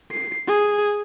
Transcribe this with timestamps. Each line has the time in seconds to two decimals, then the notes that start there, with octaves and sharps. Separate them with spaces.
0.12 C7
0.48 G#4